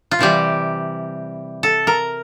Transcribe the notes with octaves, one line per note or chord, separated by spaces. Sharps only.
F4
C3 E3 G3 G4
A4
A#4